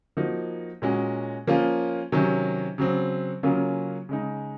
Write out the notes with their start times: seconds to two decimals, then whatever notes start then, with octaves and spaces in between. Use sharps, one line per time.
0.17 F3 A#3 D#4 F#4
0.82 A#2 G#3 C#4 F#4
1.47 F3 A#3 C#4 F4
2.12 C3 D#3 F#3 C#4
2.78 C#3 F#3 C4
3.43 C#3 F#3 A#3 C#4 F4
4.09 C#3 G#3 D#4